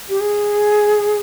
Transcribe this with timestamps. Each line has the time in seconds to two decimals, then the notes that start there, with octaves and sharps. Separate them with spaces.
0.09 G4
0.20 G#4